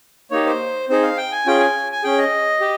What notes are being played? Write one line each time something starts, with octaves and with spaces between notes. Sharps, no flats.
A#3 D#4 G4 C#5
C5
C4 D#4 G#4 C5
F5
G5
G#5
C#4 F4 G#4 G5
G#5
G#5
C#4 G#4 G5
D#5
G4